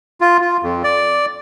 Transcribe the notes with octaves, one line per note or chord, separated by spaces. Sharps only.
F4
F4
F2
D5